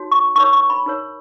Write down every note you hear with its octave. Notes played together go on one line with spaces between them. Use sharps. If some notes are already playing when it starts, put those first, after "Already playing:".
Already playing: D#4 F#4 C#5
C#6
D#4 A#4 C#5 C#6
C#6
B5
D#4 A#4 C#5